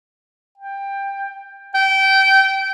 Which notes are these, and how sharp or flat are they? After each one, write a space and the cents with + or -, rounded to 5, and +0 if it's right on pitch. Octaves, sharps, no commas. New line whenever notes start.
G5 +15
G5 -20